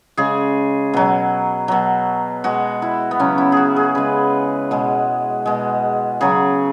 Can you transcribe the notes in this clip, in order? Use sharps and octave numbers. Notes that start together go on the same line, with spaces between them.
C#3 G#3 G#4
B2 F#3
B2 F#3
B2 G#3 F#4
E4
B3
C#3 F#3 C#4
E4
F#4 G#4
G#4
C#3 G#3 B4
B2 G#3
B2 G#3
C#3 F#3 G#4